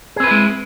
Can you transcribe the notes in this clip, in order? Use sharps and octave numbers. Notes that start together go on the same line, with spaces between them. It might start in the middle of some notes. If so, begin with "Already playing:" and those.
G#3 C4 E4 G#4 B4